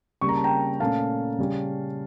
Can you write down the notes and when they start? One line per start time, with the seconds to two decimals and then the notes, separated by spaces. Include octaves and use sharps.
0.21 C#3 G3 A#3 C#6
0.29 A#5
0.36 A5
0.44 G5 A#5
0.80 A#2 A3 C#4 F5 A5
1.38 C#3 G3 C#4